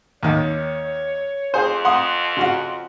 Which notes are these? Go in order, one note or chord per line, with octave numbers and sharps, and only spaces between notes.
D#2 D#3 C#5
F2 G#4 C5
F#5 C6 D#6
C#3 F#4 F#5